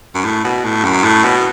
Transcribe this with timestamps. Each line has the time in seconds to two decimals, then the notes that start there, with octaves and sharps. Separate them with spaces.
0.15 F#2
0.25 A2
0.44 B2
0.64 A2
0.84 F#2
1.04 A2
1.24 B2